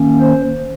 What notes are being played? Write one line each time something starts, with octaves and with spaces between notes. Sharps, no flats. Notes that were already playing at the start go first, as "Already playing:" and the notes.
Already playing: D#3 A#3 C#4
C5